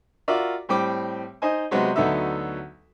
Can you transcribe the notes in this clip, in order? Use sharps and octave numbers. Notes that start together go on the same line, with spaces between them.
F4 F#4 A#4 D5 E5
A2 G3 C4 G5 D6
D#4 C5 D#5 G#5
C3 F#3 G#3 B3 C4
D2 F#3 B3 D#4 A4 E5